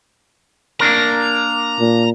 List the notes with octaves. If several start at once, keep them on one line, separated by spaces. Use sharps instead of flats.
A#3 D4 A#4 A#5
A#2